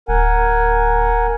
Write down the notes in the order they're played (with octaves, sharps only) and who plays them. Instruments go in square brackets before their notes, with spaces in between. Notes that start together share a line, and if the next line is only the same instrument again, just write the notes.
[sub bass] D1 [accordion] A#4 F#5 G#5